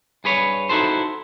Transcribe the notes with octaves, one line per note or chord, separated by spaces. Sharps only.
G2 G#4 B4 C#5
D#4 E4 F#4 A4 C5